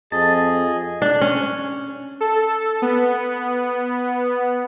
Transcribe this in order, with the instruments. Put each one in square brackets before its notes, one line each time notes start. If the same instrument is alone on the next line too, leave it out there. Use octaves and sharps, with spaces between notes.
[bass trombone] F2 [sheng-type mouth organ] G#4 D#5 [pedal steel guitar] A5
[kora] D4
C#4
[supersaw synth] A4
B3